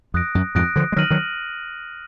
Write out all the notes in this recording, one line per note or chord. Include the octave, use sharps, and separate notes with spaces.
F2 D#6 F#6 A#6 D7
F#2
F2 G#2 D#6 F#6 A#6 D7
D3 F3
G#3
D#3 F#3 F6 A#6 D#7 F#7
D#3 F#3